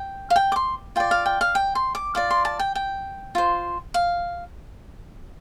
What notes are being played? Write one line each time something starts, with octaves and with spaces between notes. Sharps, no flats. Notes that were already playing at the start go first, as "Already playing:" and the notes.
Already playing: G5
F5
G5
D6
C6
F4 D5 G5
F5
G5
F5
G5
C6
D6
F4 D5 D6
C6
A5
G5
G5
F4 C5
F5